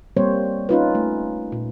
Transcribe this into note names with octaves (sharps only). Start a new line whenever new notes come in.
G3 A#3 C4 C5 C#5
C#4 D#4 F4 B4
A3
A#2